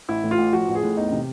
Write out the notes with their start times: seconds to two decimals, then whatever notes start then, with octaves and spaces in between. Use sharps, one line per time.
0.08 A1 E4
0.24 A2
0.31 F4
0.38 A1
0.53 F3 F#4
0.68 A1
0.75 G#4
0.83 A2
0.97 E2 D#4
1.12 C3